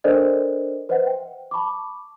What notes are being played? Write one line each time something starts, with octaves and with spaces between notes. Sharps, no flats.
D4 A4 A#4 C5 D5 D#5
B4 C5 D#5 E5 F#5
G5
A5 B5 C#6 D6